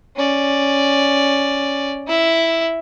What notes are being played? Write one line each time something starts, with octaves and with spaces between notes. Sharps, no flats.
C#4 D5
E4 E5